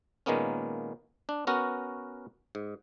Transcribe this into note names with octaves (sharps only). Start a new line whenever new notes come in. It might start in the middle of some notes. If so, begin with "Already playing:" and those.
A#2 D#3 G#3 A#3 B3 C#4
D4
B3 C#4 F#4 A#4
G#2